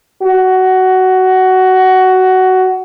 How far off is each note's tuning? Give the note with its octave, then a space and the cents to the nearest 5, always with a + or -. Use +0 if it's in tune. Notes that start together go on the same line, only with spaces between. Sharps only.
F#4 +15